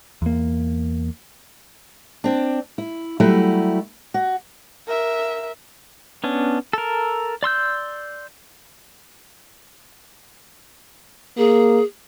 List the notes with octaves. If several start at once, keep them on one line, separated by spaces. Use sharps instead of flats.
E2 A#3
C4 D4
E4
F#3 G3 A3 E4
F#4
A#4 E5
B3 C#4 D4
A4 A#4
D5 C6 E6 G6
A#3 G#4